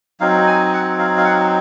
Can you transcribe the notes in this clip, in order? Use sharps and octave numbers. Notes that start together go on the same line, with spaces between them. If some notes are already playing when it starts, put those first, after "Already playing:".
F#3 C4 D#4 F5
G#5
F#5
F5
F5
F#5